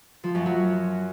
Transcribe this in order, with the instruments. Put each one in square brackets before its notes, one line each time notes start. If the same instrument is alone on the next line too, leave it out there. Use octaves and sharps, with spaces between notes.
[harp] F3
F#2
F#3